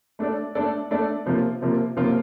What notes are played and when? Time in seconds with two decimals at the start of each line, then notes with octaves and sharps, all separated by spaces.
0.19 A3 D4 A4 D5
0.55 A3 D4 A4 D5
0.91 A3 D4 A4 D5
1.26 C3 F3 A#3 F4
1.62 C3 F3 A#3 F4
1.97 C3 F3 A#3 F4